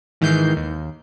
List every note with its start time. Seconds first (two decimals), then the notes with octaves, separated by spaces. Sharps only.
0.21 G#2 D#3 E3 G6 C7
0.57 D#2